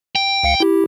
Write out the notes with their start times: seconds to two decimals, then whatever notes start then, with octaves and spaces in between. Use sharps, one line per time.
0.15 G5
0.43 C#2 F5 C#7
0.60 E4 G4